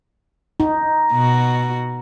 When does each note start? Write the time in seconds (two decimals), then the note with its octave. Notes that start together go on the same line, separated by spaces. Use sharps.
0.60 D#4
1.12 B2 F#4